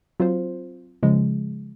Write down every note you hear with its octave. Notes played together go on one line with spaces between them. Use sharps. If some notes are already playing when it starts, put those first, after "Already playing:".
F#3 C4 F4 C5
C#3 F3 G#3